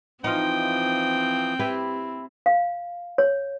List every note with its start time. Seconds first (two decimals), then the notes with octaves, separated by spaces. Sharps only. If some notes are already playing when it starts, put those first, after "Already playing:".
0.24 E3 F3 C4 D#4 F4 G5 D#6
1.59 E4 G4 B4
2.46 F5
3.18 C#5